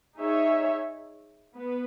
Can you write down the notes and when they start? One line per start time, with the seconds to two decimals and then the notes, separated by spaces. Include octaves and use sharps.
0.17 D#4 G#4 C#5 E5
1.56 B3 B4